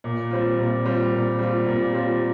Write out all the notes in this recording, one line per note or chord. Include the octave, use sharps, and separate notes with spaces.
A#2
G3 C4 F4
A#2
G3 C4 F4
A#2
G3 C4 F4
A#2
G3 C4 F4